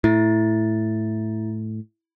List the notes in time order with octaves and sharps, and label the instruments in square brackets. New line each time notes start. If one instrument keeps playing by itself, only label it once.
[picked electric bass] A2 [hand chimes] E4 A6